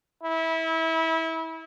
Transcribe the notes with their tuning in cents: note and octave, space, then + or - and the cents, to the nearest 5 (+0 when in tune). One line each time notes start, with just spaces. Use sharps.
E4 -25